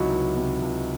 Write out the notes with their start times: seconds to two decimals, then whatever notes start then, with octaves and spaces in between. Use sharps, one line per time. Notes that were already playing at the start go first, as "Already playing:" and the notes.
Already playing: C#2 C3 F#3 D#4 E4 F#4
0.12 C#2
0.37 C3
0.62 C#2